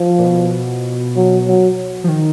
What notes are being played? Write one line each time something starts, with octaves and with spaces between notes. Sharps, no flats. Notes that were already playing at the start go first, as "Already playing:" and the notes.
Already playing: F3
A#2
B2
F#3
F#3
F3
D#3